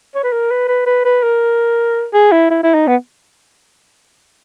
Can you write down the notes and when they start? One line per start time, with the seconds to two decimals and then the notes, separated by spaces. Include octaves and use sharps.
0.15 C#5
0.24 B4
0.33 A#4
0.51 B4
0.68 B4
0.87 B4
1.05 B4
1.23 A#4
2.14 G#4
2.32 E4
2.51 E4
2.63 E4
2.74 D#4
2.87 B3